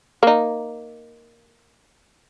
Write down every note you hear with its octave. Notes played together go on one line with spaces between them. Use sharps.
A#3 D#4